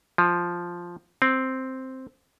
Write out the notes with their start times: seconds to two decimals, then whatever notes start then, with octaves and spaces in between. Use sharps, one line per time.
0.18 F3
1.22 C4